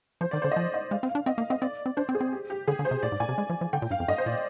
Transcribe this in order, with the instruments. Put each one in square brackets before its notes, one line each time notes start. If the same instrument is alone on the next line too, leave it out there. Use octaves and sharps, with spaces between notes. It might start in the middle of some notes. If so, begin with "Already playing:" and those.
[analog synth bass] F3 [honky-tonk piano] C5
[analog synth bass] D#3 [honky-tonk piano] D5
[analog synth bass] D3 [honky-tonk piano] C5
[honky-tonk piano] D#5
[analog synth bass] F3 [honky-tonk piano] D5
[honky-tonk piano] D#5
[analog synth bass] G#3 [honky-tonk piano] F5
[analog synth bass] C4
[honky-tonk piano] F5
[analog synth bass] D4
[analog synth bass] C4 [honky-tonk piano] D#5
[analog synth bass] A#3 [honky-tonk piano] F5
[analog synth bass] C4 [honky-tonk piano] D#5
[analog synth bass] C4 [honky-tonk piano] D5
[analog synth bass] C4
[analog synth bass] D4 [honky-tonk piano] C5
[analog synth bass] C4
[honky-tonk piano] G#4
[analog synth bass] C4
[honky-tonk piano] G4
G4
[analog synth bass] D3 [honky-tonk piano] G#4
[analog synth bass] D3
[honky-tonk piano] C5
[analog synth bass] C3
[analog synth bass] A#2 [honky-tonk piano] D5
[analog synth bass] G#2
[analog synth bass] A#2 [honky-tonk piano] G#5
[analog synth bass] C3
G#3
F3
F3
[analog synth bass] D3 [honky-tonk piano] G5
[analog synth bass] A#2
[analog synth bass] G2 [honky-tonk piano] F5
[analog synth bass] F2
[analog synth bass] G2 [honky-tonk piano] D#5
[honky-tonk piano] C5
[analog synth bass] A#2 [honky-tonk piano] D5